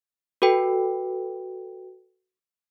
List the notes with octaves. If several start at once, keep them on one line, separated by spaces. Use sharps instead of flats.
F#4 A4 B4 G5